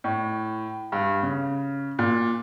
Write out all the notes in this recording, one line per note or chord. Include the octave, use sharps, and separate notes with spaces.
A2
G2
C#3
A#2